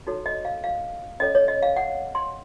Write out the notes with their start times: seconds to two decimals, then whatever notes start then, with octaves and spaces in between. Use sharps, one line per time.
0.07 D#4 F#4 A4 C#5
0.26 D#5
0.45 F5
0.64 F5
1.20 C#4 A4 C#5 D#5
1.35 C#5
1.48 D#5
1.62 F5
1.77 F#5
2.15 C6